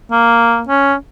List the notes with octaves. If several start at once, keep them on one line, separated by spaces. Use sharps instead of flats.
A#3
C#4